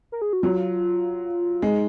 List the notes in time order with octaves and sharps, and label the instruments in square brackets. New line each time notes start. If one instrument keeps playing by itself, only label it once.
[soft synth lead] A#4
G#4
F#4
[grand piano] F#3 [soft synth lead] F4
[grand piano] G#3 [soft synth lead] D#4